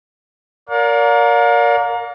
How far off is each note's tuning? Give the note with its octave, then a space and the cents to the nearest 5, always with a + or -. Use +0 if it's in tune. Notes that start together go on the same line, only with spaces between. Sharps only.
A#4 +0 D5 -35 F5 +40